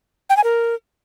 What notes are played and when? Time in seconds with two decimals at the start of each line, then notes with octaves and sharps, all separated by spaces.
0.30 G5
0.37 G#5
0.44 A#4